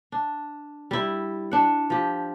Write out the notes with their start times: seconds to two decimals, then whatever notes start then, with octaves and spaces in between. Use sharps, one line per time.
0.12 D4
0.91 G3 E4
1.51 D4 F#5
1.90 F3 G4